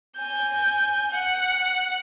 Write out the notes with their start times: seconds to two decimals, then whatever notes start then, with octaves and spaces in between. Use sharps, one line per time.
0.18 G#5 G6
1.11 F#5